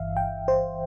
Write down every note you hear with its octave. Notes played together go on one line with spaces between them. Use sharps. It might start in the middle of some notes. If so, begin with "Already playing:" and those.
Already playing: G1 G2 E3 E5 F5
G5
C5